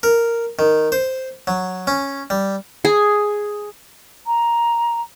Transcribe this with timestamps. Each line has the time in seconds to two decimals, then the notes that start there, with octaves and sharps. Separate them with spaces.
0.03 A#4
0.59 D#3
0.92 C5
1.47 F#3
1.87 C#4
2.30 G3
2.85 G#4
4.26 A#5